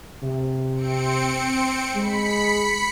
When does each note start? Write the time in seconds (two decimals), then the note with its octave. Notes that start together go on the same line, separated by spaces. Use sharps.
0.23 C3
0.74 C4 C#7 D7
1.95 G#3 B5 B6 C#7